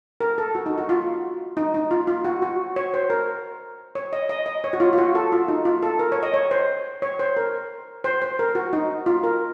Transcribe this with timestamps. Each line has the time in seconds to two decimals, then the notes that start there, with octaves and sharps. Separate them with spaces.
0.21 A#4
0.38 A4
0.55 F#4
0.66 D#4
0.78 F#4
0.89 F4
1.57 D#4
1.74 D#4
1.91 F4
2.07 F4
2.25 F#4
2.42 F#4
2.76 C#5
2.94 C5
3.10 A#4
3.95 C#5
4.13 D#5
4.29 D#5
4.46 D#5
4.64 C#5
4.73 F#4
4.80 F4
4.93 F4
4.98 F#4
5.15 A4
5.32 F4
5.48 D#4
5.65 F4
5.83 A4
5.99 A#4
6.12 C#5
6.23 D#5
6.34 C#5
6.51 C5
7.02 C#5
7.19 C5
7.37 A#4
8.04 C5
8.22 C5
8.39 A#4
8.55 F#4
8.73 D#4
9.06 F4
9.23 A#4